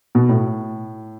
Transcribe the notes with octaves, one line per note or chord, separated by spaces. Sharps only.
B2
A2